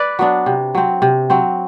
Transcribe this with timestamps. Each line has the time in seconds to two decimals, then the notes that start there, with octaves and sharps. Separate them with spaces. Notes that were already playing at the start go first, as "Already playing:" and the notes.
Already playing: B4 D5
0.19 F#3 B3 D4
0.46 C3
0.75 F#3 C4
1.02 C3
1.30 F#3 C4